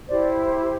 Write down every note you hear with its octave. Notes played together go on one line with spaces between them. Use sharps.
E4 G4 C5 D5